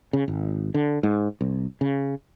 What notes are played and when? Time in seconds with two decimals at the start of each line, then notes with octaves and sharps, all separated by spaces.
0.13 C#3
0.28 G#1
0.74 D3
1.03 G#2
1.41 C2
1.81 C#3